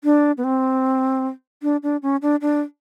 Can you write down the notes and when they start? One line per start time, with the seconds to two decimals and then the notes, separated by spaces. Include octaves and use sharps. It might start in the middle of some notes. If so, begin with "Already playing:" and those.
0.04 D4
0.38 B3
0.44 C4
1.63 D4
1.83 D4
2.03 C#4
2.22 D4
2.41 D4